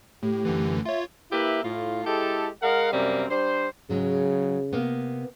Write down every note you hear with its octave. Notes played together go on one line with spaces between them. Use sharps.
A2 A3 G4
F#2 D3 E3
F4 C#5 E5
A#3 E4 G4 B4 E5
A2 F4
G#3 E4 G4 A4
G#3 A#4 F5 F#5
F#2 C3 G3 A#3 C4
G3 D4 C5
G#2 C#3 F#3 G#3
C3 A#3 B3